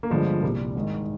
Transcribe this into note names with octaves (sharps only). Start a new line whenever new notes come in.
A#3
G1 G2 D3 F3 G#3
C2 A#2 G3 A#3
G#1 G#2 D#3